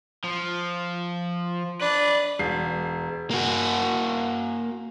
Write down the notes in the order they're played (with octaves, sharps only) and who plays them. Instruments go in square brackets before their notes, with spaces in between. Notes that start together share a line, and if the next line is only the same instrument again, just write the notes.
[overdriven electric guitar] F3
[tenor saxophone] D4 [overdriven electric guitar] B4
[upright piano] E1 C7
[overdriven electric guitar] A#3 F#4